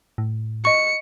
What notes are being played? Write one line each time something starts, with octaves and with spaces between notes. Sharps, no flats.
A2
D#5 C#6 C#7